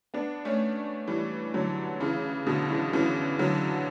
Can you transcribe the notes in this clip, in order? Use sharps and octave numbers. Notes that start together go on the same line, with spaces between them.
B3 D4
A3 C#4
E3 G3
D3 F#3
C#3 E3
B2 D3
C#3 E3
C#3 E3
D3 F#3